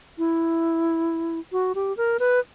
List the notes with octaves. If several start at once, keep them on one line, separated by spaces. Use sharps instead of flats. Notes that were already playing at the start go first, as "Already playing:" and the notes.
E4
F#4
G4
A#4
B4